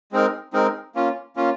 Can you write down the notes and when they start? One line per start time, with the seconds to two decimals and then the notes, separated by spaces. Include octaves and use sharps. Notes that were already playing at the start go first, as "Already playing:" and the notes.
0.12 G#3 C4 D#4 A#4
0.53 G#3 C4 D#4 A#4
0.95 A#3 C#4 F4
1.36 A#3 C#4 F4